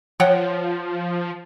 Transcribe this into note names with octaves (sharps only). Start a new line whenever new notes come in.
F3 C#5 F#5 G5